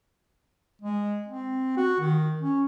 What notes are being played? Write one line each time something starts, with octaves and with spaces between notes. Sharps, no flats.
G#3
C4
F#4
D#3
C#4